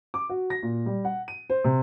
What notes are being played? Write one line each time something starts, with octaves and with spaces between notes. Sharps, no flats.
D6
F#4
A#6
A#2
G3
F#5
D#7
C5
C3